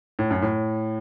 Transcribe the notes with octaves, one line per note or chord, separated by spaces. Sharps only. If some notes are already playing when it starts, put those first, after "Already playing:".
A2
F#2
A2